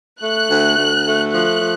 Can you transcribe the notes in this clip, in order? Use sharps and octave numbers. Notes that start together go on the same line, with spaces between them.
A3 F#6
D2
D2
A3
F3 F#6
F3